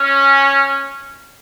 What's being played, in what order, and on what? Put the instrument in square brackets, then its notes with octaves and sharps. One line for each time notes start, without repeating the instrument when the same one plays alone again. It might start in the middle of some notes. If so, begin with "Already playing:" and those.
Already playing: [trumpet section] C#4